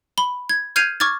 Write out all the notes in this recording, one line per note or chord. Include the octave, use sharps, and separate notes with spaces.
B5 G7
G#6
F6 G6 G#6 C7 D#7 F7
C#6 D6 F6 G#6 A6